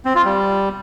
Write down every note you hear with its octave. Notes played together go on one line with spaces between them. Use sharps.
C4
F4
G3